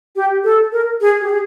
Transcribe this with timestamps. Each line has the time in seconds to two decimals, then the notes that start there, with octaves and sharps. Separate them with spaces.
0.16 G4
0.44 A4
0.72 A#4
1.01 G#4
1.21 G4
1.29 G#4